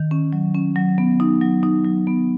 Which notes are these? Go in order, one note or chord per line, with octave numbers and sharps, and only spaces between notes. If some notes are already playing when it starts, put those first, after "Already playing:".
Already playing: D#3
C#4
F#3
C#4
F#3
B3
D#4
F#3
D#4
F#3
B3